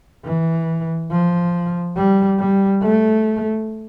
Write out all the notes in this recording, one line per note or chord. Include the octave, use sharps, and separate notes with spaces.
E3
F3
G3
G3
A3